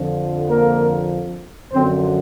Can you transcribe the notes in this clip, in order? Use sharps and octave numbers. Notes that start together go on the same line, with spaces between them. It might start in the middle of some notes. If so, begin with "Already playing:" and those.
Already playing: F2 D3 F3
A#3 A#4
F#2 D3 F3 C4 C5